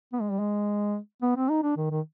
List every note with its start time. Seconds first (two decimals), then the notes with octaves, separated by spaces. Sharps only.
0.13 B3
0.21 G#3
0.31 G3
0.39 G#3
1.22 B3
1.36 C4
1.49 D#4
1.63 D4
1.77 D#3
1.91 D#3